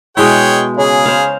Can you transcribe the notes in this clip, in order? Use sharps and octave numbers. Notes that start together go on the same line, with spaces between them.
B2 G#3 E4 G#4 C#5 G5
C#3 G#4
C5 F5